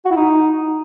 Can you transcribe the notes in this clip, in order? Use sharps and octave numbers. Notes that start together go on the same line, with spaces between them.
F#4
E4
D#4